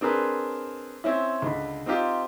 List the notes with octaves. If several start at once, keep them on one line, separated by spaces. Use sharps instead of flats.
C4 D4 G#4 A#4 B4
C4 C#4 E4
C#2 D3 B5
C4 D#4 F4 G4